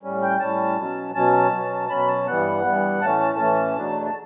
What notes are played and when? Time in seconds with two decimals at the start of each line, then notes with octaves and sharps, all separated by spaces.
0.03 A2 G3 C#4
0.22 G5
0.39 A2 G3 C#4 A5
0.77 B2 F#3 C#4
1.14 B2 F#3 C#4 A5
1.52 B2 F#3 C#4
1.89 B2 F#3 C#4 B5
2.07 A5
2.26 G2 E3 G3 B3 F#5
2.64 G2 E3 G3 B3
3.01 A2 E3 A3 C#4 A5
3.39 A2 E3 A3 C#4
3.76 E2 B2 F#3 A3 D4
4.06 A5